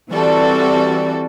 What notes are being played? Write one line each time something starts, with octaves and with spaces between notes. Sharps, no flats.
E3 G3 C4 F#4 A4 D5